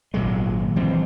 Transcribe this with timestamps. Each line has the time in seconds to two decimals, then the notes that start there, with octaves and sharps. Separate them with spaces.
0.14 G#1 A#2 F#3 G#3
0.76 E3 G3 C4